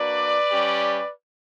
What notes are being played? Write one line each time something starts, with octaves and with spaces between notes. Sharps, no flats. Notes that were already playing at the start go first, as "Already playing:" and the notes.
Already playing: A#3 D4 F#4 B4 D5
G3 C#4 G4